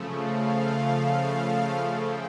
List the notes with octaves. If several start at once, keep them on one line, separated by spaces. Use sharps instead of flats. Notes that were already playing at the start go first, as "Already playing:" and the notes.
Already playing: C#3 F3 A3
F5
G5